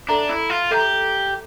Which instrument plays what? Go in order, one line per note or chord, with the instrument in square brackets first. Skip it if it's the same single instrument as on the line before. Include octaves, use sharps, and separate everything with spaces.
[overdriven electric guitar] D4 [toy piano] A4 E5 A#5
[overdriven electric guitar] E4
F4
[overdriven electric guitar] G4 [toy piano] A4 E5 A#5